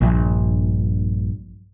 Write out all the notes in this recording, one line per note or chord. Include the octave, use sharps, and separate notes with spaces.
A#1 G2